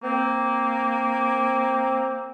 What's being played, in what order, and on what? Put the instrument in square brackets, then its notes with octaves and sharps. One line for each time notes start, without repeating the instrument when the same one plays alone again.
[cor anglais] A#3 [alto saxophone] C4